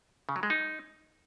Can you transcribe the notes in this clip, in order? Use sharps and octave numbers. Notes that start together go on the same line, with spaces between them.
C#3
F#3
G#3
D#4